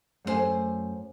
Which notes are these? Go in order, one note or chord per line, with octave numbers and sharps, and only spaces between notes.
F#2 A3 C4 C5 G#5